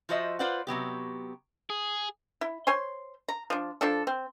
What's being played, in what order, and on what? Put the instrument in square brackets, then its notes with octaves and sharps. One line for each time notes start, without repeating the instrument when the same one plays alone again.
[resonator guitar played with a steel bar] F3 F4 F#4 C5 D#5 E5
F4 B4 C5 D5 F5 F#5
C3 F#3 B3 G4
[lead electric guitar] G#4
[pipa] E4
C5 C#5 G#5 C6
A#5
F3 D4
F3 D4 A4
C4